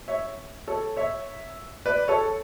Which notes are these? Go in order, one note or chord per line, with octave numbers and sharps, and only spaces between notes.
C#5 E5
A4 C#5
C#5 E5
B4 D5
A4 C#5